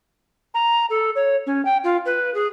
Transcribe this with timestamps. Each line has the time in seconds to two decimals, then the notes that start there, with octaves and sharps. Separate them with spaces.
0.54 A#5
0.90 A4
1.16 C#5
1.47 C#4
1.65 G5
1.84 F4
2.06 B4
2.34 G#4